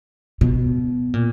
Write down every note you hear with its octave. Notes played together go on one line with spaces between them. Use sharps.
B2
A#2